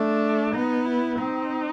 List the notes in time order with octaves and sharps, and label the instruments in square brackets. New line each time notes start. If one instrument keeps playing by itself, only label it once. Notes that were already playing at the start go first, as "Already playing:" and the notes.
Already playing: [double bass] A3 [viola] D4
[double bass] B3 [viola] D#4
[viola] E4
[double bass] C4 [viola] D#4